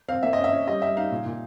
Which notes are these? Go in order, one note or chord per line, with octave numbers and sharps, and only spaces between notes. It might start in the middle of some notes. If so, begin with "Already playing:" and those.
C4 F5
A#3 E5
C#4 D#5
E5
C#4
G3 D#5
G3 E5
D#4 F5
A#2
A#2